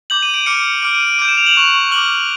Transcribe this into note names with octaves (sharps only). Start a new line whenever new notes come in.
D6 G6 F#7
D#7
D7
D6 F6 C#7
D6 F6 D7
D#7
D7
D6 G6 D7
E7
F7
F#7
C#6 F#6
D6 F6 F#7